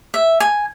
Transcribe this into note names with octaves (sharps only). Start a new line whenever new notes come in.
E5
G#5